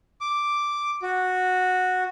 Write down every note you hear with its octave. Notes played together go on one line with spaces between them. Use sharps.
D6
F#4